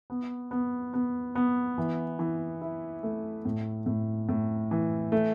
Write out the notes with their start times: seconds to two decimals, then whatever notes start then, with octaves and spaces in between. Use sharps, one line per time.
0.10 B3
0.51 B3
0.94 B3
1.35 B3
1.78 E3
2.19 E3
2.61 E4
3.03 A3
3.45 A2
3.86 A2
4.29 A2
4.71 E3
5.12 A3